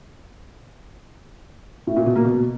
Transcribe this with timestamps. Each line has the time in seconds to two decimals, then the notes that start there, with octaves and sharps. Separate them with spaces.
1.87 A2
1.97 A#2
2.06 B2
2.16 A#3
2.25 B2